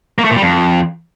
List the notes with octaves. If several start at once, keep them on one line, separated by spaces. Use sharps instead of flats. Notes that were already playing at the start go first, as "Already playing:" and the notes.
A#3
A3
A#2
G3
F2